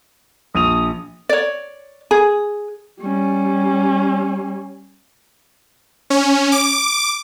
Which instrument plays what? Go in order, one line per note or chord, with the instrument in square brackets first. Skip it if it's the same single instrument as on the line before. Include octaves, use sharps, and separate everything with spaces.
[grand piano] A#1 D#7 F7 [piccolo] D#6
[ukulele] C#5 D5
G#4
[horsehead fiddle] G3 C#4
[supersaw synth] C#4
D6